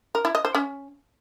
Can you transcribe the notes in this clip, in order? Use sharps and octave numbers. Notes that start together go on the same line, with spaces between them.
A#4
E4
D#5
C5
C#4